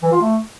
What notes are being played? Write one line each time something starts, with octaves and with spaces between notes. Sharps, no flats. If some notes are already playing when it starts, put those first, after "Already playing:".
E3
F4
A3